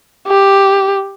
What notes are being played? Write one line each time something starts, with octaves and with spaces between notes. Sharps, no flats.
G4